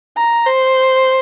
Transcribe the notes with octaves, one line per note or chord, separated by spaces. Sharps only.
A#5
C5